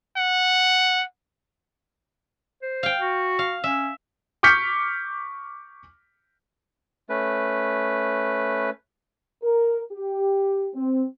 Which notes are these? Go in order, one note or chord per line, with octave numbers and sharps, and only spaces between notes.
F#5
C5
F5 G5
F#4
F5
C#4 E5
C#6 D6 F6 G6 B6 C#7
A3 C#4 B4
A#4
G4
C4